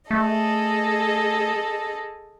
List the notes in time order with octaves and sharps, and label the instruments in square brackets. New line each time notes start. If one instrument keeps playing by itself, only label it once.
[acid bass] A3 [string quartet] G#4 A4 D#5